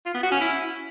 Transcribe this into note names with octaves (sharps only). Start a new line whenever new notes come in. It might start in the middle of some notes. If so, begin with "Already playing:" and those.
F4
B3
F#4
C#4
E4